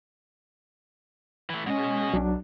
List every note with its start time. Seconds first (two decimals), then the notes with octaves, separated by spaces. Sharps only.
1.50 E3 A3
1.67 B2 G#3 C#4 D#5
2.13 B1 F#3 D4